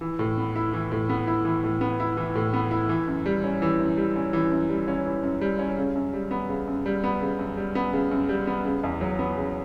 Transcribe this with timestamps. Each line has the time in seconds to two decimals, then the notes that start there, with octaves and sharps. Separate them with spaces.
0.01 E3
0.19 A2
0.38 B3
0.56 E4
0.73 E3
0.92 A2
1.09 B3
1.27 E4
1.45 E3
1.64 A2
1.81 B3
2.00 E4
2.17 E3
2.35 A2
2.54 B3
2.71 E4
2.89 E3
3.07 F#2
3.26 G3
3.44 C#4
3.62 E3
3.79 F#2
3.97 G3
4.16 C#4
4.33 E3
4.51 F#2
4.69 G3
4.88 C#4
5.05 E3
5.23 F#2
5.41 G3
5.59 C#4
5.77 C#3
5.95 F#2
6.13 G3
6.31 B3
6.49 C#3
6.67 F#2
6.86 G3
7.04 B3
7.21 C#3
7.39 F#2
7.57 G3
7.75 B3
7.93 C#3
8.11 F#2
8.29 G3
8.47 B3
8.65 C#3
8.83 E2
9.01 F#3
9.19 B3
9.37 C#3